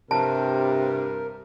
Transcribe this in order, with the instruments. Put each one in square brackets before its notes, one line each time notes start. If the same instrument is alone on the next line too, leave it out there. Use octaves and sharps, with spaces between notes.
[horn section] G2 [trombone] C3 [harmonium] A#4 [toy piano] A5